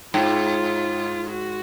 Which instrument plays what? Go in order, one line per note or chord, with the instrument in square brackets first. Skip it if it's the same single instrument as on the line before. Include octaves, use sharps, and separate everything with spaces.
[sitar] G#2 [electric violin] F4
[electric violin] F#4